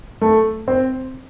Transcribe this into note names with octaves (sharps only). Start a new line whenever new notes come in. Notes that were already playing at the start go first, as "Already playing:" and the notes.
A3
C4